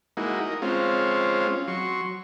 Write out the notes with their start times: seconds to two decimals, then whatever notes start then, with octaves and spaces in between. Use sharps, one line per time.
0.17 G#3 A#3 D#4 E4 F#4
0.41 A#4 D#5
0.62 G#3 C4 C#4 F4
1.68 F#3 C6 C#6